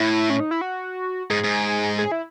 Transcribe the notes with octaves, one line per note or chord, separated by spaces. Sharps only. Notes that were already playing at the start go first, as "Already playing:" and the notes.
Already playing: A2 E4
C#4
D#4
E4
F#4
G#2 G#4
G#2
G#4
E4